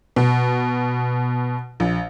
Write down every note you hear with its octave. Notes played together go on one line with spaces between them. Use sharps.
B2
A#1